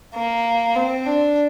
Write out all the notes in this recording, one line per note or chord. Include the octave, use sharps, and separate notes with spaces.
A#3
C4
D4